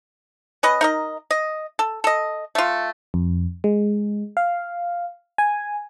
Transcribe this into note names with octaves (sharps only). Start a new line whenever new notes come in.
C#4 B4 D#5
D#4 A#4 D#5
D#5
A4
A4 D#5
A3 F4
F2
G#3
F5
G#5